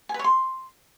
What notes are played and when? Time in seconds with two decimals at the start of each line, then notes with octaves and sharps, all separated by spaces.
0.09 G#5
0.14 B4
0.19 C#5
0.24 C6